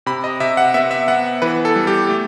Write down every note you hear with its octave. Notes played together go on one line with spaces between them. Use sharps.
C3 B5
D#5
C3 E5
F#5
B3 E5
E5
B3 F#5
E3 B4
A4
G3
G4
A3